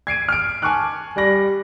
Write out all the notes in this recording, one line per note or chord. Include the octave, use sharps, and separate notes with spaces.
G#6 C7 D7 D#7
F6 D7
G#5 A5 C#6 D6 F6 F#6
G3 D5 B5 A#6 F#7